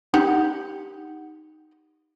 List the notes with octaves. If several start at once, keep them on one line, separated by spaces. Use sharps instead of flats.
D#4 G4 F#5